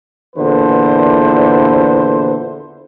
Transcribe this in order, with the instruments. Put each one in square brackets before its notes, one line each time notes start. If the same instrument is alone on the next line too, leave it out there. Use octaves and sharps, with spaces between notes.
[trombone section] E2 A#2 D3 E4 B4 C5